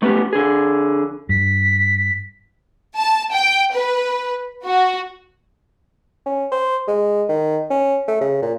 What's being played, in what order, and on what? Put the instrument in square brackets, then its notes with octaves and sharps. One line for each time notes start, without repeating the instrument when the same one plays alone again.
[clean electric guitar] A3 B3 C#4 F#4 G4
D3 G#4
[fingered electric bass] G2 [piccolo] B6
[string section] A5
G5
B4
F#4
[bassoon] C#4
C5
G#3
D#3
C#4
A3
C#3
A#2